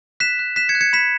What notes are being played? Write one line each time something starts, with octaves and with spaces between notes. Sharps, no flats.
F#6 B6 E7
F#6
F#6 B6 E7
G#6 C#7
F#6
G#6 C#7
B5 B6 E7